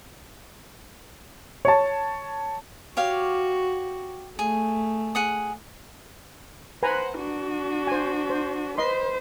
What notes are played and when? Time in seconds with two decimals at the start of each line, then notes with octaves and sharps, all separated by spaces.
1.65 C#5 A5
2.97 F#4 G4 C#5 F5
4.39 A3 G#4
5.15 G#4 F#5 D#6
6.83 B4 C5 F#5 G#5 A#5
7.18 D4 F#4
7.87 C5 G#5
8.30 C5
8.78 B4 C5 D#5 C6